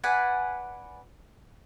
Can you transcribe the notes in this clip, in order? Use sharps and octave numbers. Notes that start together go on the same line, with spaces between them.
B4 D5 F#5 G#5